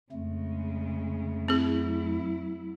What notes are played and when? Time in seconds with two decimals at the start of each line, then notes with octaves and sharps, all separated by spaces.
0.12 F2 C#3 G#3 A3
1.48 F#3 C4 E4 G#4